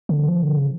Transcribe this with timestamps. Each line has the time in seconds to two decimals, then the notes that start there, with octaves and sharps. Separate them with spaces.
0.09 D3
0.29 F3
0.43 D3
0.57 C#3